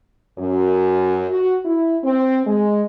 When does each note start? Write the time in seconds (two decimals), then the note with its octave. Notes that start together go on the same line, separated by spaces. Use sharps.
0.38 F#2
1.30 F#4
1.66 E4
2.04 C4
2.46 G#3